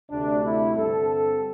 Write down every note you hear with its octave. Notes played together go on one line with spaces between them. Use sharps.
D2 C3 A3 D4
E4
G2 D3 C4 A4
A4